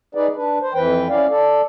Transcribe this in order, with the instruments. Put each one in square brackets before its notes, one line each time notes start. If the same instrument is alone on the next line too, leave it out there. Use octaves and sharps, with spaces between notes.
[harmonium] D#4 G#4 B4 D5
D4 B4
C5
F2 E3 B4 G5
C#4 E4 D5 F5
A4 D5